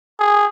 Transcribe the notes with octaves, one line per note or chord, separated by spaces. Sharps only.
G#4